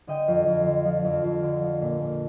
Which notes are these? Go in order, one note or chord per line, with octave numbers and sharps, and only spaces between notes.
D3 D#5 G5
F2
F2
D3
F3
F2
F2
D3
F3
A#2
A#2